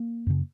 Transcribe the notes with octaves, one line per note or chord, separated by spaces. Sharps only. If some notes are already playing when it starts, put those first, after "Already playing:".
Already playing: A#3
F#2 C#3